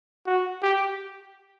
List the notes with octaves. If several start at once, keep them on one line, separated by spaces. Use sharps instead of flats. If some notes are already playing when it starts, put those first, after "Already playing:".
F#4
G4